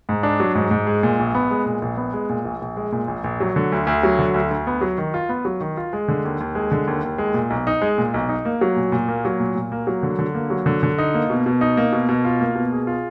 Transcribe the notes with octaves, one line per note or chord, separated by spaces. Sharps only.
G#2
D4
F#3
G#2
G#2
G#3
A#2
A#1
B3
G#3
A#2
A#1
B3
G#3
A#2
A#1
A#1
G#3
A#2
A#1
A#1
F#3
D3
D2
D2
F#3
D3
D2
D2
B3
F#3
D#3
F4
B3
F#3
D#3
F4
G#3
D3
D#2
D#2
G#3
D3
D#2
D#2
G#3
A#2
B1
D#4
G#3
A#2
B1
D#4
A#3
F#3
A#2
A#2
A#3
F#3
A#2
A#2
A#3
F#3
D3
D3
A#3
F#3
D3
D3
D#4
A#3
B2
B2
D#4
A#3
B2
B2
F4
A#3
B2
G#4
F4